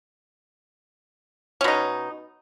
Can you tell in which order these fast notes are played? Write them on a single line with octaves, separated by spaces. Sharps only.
C#4 B2 D#4